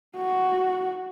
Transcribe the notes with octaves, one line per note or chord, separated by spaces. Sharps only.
F#4